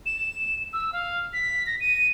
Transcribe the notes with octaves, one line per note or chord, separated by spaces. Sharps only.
E7
E6
F5
B6
A#6
D#7